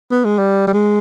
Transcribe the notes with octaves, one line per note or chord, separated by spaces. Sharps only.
B3
G#3
G3
G3
G#3